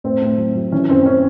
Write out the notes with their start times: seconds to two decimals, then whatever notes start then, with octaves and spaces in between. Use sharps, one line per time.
0.04 A2 C4
0.22 A2
0.38 F#3
0.55 F#3
0.72 E3 C#4
0.89 F#2 C4
1.02 C4
1.06 C#4